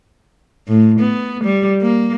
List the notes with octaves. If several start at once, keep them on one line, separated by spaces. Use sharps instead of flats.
A2
B3
G3
A#3